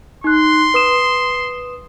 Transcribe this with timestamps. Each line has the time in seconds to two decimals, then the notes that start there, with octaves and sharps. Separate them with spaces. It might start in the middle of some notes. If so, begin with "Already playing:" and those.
0.24 D#4 C6 F#6
0.74 B4 D#6 E7